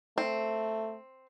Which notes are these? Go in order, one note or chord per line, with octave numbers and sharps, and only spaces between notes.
A3 C4